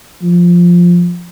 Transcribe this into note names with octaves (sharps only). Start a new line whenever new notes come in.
F3